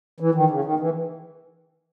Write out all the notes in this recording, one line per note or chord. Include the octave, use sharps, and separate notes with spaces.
E3
D#3
C#3
D#3
E3